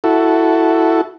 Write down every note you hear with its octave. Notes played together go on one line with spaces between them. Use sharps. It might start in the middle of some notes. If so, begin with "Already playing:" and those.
E4 F#4 A4